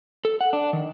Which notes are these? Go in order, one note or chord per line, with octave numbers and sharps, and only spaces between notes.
A4
F#5
D4
D#3